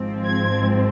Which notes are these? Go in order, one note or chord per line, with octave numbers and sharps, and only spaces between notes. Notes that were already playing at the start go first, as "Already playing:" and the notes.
Already playing: G#1 G#2 F3 C4
G#6